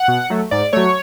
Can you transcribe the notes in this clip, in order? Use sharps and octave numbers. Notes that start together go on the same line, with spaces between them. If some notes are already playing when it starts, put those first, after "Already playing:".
Already playing: F#5
B2
F#3 A3
G#2 D5
F#3 A3 C#5